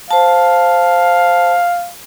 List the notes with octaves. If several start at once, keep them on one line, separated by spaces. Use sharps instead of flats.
C5 F5 A5